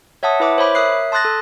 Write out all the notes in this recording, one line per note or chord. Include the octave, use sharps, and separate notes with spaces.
C#5 E5 F#5 A5 D#6
E4 B4 E5 D6
C5 C#5 B5 D6
A#4 C#5 E5 D#6 F#6 C7
A5 C6 D#6 F#6 A6 A#6
A4